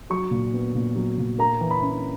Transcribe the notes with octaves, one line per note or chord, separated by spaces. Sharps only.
F#3 C#6
A#2
B3
A#2
F#3
A#2
A#3 A#5
E3
B5
C#4